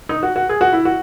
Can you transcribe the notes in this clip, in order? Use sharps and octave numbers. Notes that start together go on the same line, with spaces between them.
D#4
F#4
F#4
G#4
F#4
E4
F#4